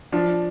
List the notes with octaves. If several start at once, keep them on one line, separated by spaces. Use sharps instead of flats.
F3 D4